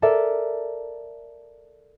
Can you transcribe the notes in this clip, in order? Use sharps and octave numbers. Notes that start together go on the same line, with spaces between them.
A4 A#4 D5 E5 A5